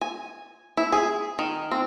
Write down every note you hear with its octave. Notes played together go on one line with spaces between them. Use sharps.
G#5
E4
G#4
D#3
C4